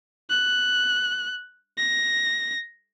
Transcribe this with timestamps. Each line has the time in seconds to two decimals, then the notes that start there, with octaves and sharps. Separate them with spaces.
0.30 F#6
1.77 A#6